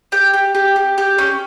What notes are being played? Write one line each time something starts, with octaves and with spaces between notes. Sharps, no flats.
G4 G5
G4
G4
G4
G4
C#4